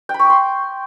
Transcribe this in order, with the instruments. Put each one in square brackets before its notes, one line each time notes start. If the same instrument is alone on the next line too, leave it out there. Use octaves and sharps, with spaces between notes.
[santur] G5
B5
C#6
D6
C6